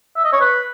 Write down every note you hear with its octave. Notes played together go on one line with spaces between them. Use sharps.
E5
D#5
C#5
B4